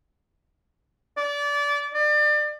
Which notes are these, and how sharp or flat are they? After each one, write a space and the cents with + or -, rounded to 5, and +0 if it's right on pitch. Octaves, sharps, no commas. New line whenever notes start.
D5 -25
D5 +30